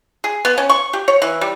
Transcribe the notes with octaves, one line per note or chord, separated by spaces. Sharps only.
G#4
B3
C#4
C#6
G4
C#5
E3
G3